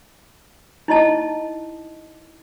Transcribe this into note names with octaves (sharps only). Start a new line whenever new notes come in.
D#4 E4 D#5 A5